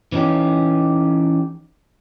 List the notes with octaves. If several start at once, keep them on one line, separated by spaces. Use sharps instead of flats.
E3 C#4 D#4 G4